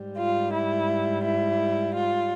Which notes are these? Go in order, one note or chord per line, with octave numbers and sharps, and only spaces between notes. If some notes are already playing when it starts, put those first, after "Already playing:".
Already playing: G#2 G3
F4
E4
E4
F4